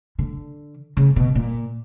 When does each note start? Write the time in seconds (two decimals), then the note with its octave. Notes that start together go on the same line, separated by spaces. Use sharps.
0.19 D3
0.97 C#3
1.16 B2
1.35 A#2